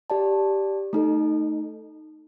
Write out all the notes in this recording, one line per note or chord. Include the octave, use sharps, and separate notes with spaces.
G4 D5 A5
A3 D#4 A4